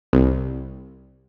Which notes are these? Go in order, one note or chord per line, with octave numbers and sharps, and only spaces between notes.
C2